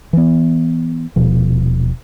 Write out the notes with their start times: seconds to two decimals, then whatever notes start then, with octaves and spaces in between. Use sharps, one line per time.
0.13 E3 B3
1.16 D#1 B2 F3